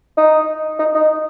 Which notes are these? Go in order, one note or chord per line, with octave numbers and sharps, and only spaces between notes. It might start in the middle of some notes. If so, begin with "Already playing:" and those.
D#4
D#4
D#4